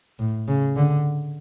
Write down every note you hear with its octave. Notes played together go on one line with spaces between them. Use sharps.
A2
C#3
D3